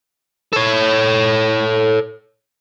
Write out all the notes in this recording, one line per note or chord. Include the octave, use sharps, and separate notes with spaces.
A4 C#5